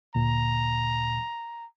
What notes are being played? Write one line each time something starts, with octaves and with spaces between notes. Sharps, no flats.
D2 A#2 A#5